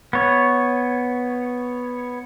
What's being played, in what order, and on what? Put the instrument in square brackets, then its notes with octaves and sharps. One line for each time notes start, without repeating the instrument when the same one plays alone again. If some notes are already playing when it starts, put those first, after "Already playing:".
[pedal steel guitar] B3 C#5